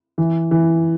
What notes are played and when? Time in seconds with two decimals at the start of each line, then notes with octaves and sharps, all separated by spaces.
0.18 E3
0.51 E3